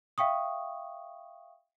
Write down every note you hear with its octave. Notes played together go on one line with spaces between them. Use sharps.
E5 F5 G5 C#6 D#6